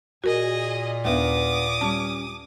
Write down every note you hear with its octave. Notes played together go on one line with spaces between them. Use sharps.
A#2 F#4 G#4 A#4 D#5
D#2 A#3 B3 D4 E5 D6 D#6
G3 C#4 A5